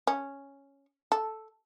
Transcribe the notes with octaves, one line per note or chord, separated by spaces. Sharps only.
C#4
A4